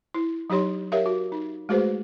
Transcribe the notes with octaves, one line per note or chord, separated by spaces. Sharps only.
E4
F#3 D#4 G4 C#5 C6
G4 A#4 C#5 E5 F5
F#4
D#4
G#3 A3 F#4 G#4 B4 C5